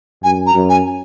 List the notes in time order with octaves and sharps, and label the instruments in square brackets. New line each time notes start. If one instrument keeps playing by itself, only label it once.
[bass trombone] F#2 [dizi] G#5
[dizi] A#5
[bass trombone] F#2
[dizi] G#5